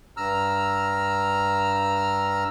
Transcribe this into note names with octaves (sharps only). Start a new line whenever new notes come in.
G2 A#5 E6 F6